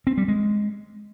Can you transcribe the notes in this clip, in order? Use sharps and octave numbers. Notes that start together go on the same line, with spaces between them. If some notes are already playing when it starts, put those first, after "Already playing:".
C4
G3
G#3